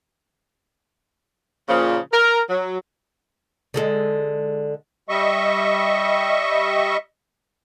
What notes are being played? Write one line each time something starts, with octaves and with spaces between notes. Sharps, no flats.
A#2 C#3 F3
A#4
F#3
D3 G#3 A4
G3 D#5 E5 C#6